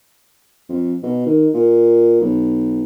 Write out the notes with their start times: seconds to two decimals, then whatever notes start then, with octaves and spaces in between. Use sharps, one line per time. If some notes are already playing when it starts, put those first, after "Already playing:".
0.69 F2
1.03 B2
1.26 D#3
1.54 A#2
2.21 B1